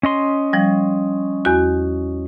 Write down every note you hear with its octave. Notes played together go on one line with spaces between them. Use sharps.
C#4 D#5 C6
F3 G3
E2 F#4